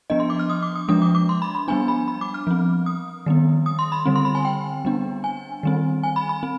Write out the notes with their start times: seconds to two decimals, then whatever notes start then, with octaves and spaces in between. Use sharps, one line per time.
0.10 F3 B3 D4 D#5
0.20 C6
0.30 D6
0.39 F6
0.50 D#6
0.63 D6
0.76 D#6
0.88 F3 G#3 D4 D#6
1.02 D6
1.15 D6
1.29 C6
1.42 B5
1.55 B5
1.68 G3 B3 D4 G#5
1.88 B5
2.08 B5
2.21 D6
2.34 F6
2.47 F3 C4
2.86 D#6
3.26 D#3 G3 B3
3.66 D#6
3.79 C6
3.92 B5
4.06 D3 G3 C4
4.16 C6
4.25 B5
4.35 G#5
4.45 G5
4.85 G3 B3 D4
5.24 G#5
5.63 D#3 G3 C4
6.03 G#5
6.16 B5
6.29 B5
6.43 C4